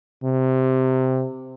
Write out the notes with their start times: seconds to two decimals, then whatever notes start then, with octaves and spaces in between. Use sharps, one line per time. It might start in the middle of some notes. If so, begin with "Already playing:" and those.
0.24 C3